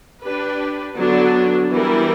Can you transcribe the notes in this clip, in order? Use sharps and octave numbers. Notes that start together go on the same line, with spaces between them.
D4 G4 B4
D3 F#3 B3 D4
E3 G3 B3 E4 A#4